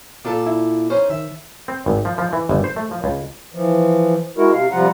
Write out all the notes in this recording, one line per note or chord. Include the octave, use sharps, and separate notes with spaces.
A#2 F4 A4 D5
E4
C#4 D#4 C5
D#3 E5
C4
G#1
F3
F3
E3
G1
C5
A3
F3
C#2
E3 F3
G#3 E4 F#4 A#4
C3 F5
C3 F3 G3 F4 F#5 A#5